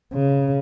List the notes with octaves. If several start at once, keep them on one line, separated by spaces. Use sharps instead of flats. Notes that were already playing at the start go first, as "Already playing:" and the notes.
C#3